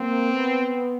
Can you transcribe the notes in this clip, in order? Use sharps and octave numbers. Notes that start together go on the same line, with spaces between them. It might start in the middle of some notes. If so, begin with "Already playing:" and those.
Already playing: A#3 C4
B3